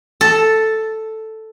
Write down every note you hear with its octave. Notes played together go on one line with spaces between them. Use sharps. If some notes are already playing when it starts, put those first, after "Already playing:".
A4